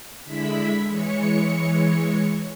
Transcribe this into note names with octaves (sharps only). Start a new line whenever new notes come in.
D3 G#3 E4 E5 B5 B6
E3 G#3 C#5 C#7